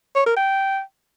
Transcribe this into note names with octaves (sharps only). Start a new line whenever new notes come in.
C#5
A#4
G5